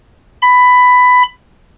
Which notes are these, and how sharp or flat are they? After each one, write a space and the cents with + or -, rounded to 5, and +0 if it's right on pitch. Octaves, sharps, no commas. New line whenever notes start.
B5 +10